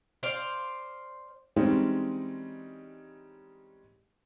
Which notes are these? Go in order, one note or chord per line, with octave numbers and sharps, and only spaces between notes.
C5 D5 F5
E3 G3 G#3 C4 C#4 D#4